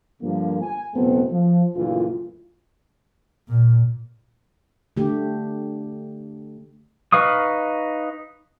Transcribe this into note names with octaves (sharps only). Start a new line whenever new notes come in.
G2 D3 F3 A#3
G#5
F#1 E2 B2 A3 B3 C4
F3
F#1 D2 A#2 E3 F4
A#2
D3 A3 G4
D#4 B4 F5 C#6 D#6